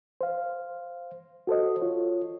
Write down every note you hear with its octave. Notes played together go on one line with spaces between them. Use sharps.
C5 F5
F#4 A4 C5 D#5
F4 C#5